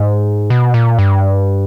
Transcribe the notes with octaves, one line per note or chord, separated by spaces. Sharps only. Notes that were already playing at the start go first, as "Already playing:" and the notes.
Already playing: G#2
B2
A#2
G2